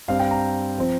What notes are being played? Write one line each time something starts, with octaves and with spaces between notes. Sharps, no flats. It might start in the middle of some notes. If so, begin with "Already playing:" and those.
G2 G3 C4 F5
G5
A#5
F3 C4